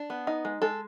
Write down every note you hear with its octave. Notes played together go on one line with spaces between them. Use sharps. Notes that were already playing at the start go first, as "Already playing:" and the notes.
Already playing: D4
B3
D#4
G#3
G#3 A4